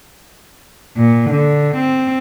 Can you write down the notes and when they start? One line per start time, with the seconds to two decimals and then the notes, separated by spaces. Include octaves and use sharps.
0.96 A#2
1.29 D3
1.76 C4